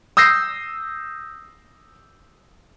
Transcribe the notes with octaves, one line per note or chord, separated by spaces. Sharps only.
D#6 E6 G6 A#6 C7